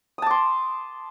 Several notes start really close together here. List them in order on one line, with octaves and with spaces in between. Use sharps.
D#6 A5 D6 C6